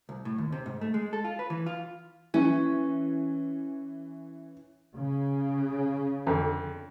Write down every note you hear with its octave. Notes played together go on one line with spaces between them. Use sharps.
C2
A2
D#2
C3
G#2
A3
G#3
A4
F4
B4
E3
F4
E3 C#4
C#3
F2 D3